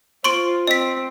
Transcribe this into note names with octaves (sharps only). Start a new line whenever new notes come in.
F4 C5 C6 C#6 D7
C4 D#5 B6